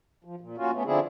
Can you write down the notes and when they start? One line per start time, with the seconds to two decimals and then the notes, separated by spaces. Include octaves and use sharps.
0.25 F3
0.41 A#2
0.58 A#3 C#4 F4 F#4
0.73 A3 B3 C#4
0.85 D3 F3 C4 D4 E4 G#4